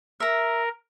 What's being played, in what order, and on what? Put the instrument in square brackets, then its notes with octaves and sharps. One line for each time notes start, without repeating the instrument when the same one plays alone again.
[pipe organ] A#4 [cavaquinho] E5 A#5